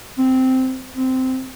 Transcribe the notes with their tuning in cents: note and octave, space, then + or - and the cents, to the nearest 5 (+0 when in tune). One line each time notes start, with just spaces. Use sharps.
C4 -10
C4 -15